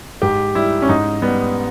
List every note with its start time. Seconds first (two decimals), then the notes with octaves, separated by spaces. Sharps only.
0.22 G#2 G4
0.55 G3 E4
0.82 C#4
0.89 G#2 D#4
1.22 G3 B3